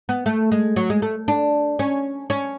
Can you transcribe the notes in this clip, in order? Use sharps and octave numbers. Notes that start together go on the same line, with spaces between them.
B3
A3
G#3
F#3
G#3
A3
D4
C#4
C#4